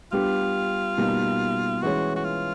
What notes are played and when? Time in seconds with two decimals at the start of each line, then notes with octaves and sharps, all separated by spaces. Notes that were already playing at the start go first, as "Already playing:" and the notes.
0.12 G3 B3 D4 F4 G4
0.98 B2 G3 A#3 D#4
1.82 E3 G#3 C#4 F#4
2.16 F#4
2.25 F4